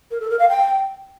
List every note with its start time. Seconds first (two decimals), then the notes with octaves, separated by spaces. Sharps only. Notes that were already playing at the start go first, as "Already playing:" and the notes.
0.11 A#4
0.20 A4
0.30 A#4
0.39 F5
0.49 G5